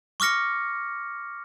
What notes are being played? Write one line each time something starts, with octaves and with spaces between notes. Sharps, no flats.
C#6 D6 F6 A#6 C#7